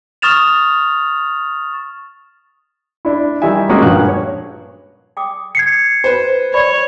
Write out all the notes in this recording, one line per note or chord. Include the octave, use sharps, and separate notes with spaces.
C#6 D#6 F6 A6 E7 F7
D4 E4
D#3 G3 E4 E5 G#5
G#3 A#3 C#4 F#4 D#6 F#6
G2 A#2 F3 F#4 F#6
C#5
G5 D6 D#6
G#6 C7 C#7
B4 C5
C#5 D5 B5